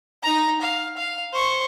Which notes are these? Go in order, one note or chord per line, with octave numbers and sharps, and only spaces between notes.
D#4 A#5
F5
F5
C5 C#6